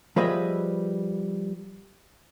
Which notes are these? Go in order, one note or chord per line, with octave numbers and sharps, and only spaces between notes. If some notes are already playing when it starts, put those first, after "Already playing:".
F3 G3 G#4 B4 D#5 E5